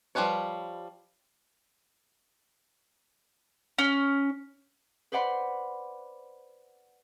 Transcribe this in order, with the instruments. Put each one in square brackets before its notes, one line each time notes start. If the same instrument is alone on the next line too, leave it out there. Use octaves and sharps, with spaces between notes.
[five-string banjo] F3 G3 A3 B4 C#5
[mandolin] C#4
[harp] B4 C5 D5 F#5 B5 C6